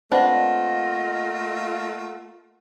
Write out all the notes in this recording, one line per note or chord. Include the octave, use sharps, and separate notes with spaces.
A3 A#3 C4 D4 F4 B4 D#5 F#5